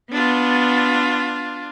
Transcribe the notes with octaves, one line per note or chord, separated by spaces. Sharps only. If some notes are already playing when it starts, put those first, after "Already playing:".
B3 D4 F4